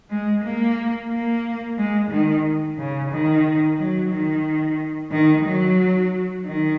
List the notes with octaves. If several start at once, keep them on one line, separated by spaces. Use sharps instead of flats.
G#3
A#3
A#3
G#3
D#3
C#3
D#3
F#3
D#3
D#3
F#3
D#3